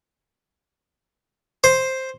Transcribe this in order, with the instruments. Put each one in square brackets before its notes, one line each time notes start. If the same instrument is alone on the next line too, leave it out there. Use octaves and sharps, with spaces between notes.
[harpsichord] C5